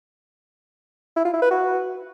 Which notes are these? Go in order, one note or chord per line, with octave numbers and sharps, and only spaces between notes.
E4
F4
E4
B4
F#4